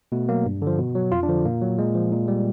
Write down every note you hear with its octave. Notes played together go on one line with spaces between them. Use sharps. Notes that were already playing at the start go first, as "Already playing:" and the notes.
B2 A3
F#3 A#3
G2
D3 F3
B2
F#3
F2 F4
D4
D3 F3
A#2 A#3
F#3
A#2 G#3
F3
A#2
G3